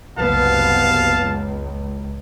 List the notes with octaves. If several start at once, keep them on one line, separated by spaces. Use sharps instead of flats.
F#1 C2 B3 F5 A5
C#2